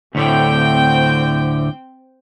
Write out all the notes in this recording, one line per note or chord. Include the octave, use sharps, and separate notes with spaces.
D2 A2 D3 C4 G5